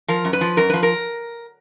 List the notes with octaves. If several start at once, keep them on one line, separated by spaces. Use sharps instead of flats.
F3 A#4
F#2
B4
F3
F#2 A#4
F3 B4
A#4